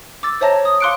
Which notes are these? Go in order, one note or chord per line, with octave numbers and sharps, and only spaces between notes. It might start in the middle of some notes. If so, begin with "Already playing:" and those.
D6 E6 A6
C5 C#5 E5 A5 A#5 A#6
C#5
D#6
F5 C6 D6 F#6 C#7 D7